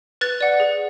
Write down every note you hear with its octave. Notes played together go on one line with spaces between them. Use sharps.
B4 F#6 A6
D5 F#5
G#4